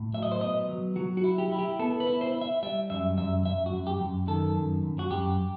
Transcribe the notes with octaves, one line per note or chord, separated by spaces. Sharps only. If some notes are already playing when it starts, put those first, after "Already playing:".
Already playing: A2
F#3 E5
D#5
C5
B3 D#5
F#3
F#3 F#4
F#4
E4
G4
E4
G4
B3 A4
B4
E4
C5
E4
E5
G3 E5
F#2 E5
F#2 E5
F#2 E5
F#4
F#2
G4
F#2
D#3 A4
F#2
F#2
F#4
F#2 G4